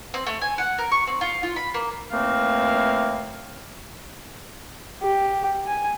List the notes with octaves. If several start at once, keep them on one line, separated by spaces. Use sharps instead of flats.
C4
A3
G#5
F#5
A#4
C#6
C4
F4
F4
B5
A#3
D#2 E3 A3 A#3 C4 F5
G4
G#5